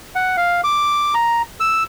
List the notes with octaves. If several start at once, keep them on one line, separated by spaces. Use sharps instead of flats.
F#5
F5
D6
A#5
E6